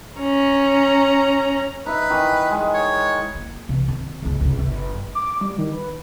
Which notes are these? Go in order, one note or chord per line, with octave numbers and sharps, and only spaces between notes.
C#4 A#5
D#4 B4 E5
D#3 E3
G#3
C#5
A#3
C3 E3
D#3 C4
G1 C#2
C#2 C3
G1
D6
G3
D#3
B4